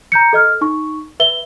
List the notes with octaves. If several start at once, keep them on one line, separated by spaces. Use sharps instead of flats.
A#5 G6 C#7
A4 D#5 F6
D#4 C#6
B4 E5 G7